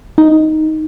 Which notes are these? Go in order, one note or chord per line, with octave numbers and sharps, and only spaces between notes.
D#4